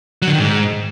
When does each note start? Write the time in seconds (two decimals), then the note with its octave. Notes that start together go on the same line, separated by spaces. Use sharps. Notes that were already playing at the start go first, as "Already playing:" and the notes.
0.22 F#3
0.28 D3
0.33 D#3
0.39 G#2